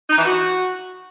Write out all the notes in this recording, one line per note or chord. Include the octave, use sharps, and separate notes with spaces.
D#4
E3
F#4